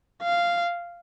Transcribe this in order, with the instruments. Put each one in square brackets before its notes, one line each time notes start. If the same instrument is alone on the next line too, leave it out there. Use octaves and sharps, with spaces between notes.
[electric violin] F5